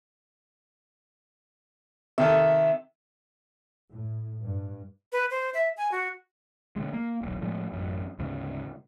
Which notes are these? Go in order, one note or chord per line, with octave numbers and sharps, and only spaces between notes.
C3 D#3 A4 E5
A2
G2
B4
C5
E5
G#5
F#4
B2 D3 G#3
A#3
D#1 B1
A2 F3 G#3
A1 F#2
D2 G#2 C#3